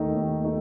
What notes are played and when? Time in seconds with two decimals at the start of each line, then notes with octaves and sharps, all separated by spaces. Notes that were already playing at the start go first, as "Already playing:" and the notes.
Already playing: D#2 D#3 A3 D#4
0.15 D#2
0.44 A3 D#4